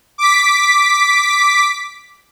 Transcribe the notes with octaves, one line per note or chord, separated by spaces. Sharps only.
D6 B6